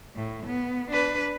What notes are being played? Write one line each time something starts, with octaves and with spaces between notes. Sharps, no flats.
A2
B3
D4 B4